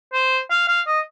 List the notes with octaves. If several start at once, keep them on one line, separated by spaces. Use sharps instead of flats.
C5
F5
F5
D#5